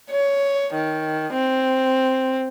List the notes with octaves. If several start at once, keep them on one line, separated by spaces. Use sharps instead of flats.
C#5
D#3
C4